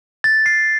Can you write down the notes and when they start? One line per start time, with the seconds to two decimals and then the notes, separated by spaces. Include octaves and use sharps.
0.24 A6
0.46 C7